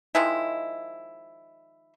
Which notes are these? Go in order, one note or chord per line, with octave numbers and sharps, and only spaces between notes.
D#3 F3 G#3 E4